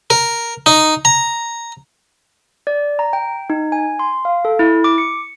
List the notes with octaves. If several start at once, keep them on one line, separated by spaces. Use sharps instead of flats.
A#4
D#4
A#5
D5
A#5
G5
D#4
G#5
C6
F5
A4
E4
D6
C#7